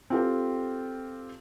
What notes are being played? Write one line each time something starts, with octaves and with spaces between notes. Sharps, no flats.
C4 F4 G4 A4